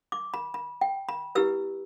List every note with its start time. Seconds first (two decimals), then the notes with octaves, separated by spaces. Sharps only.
0.12 D6
0.34 B5
0.54 B5
0.81 G5
1.09 B5
1.35 E4 G4 B4 E6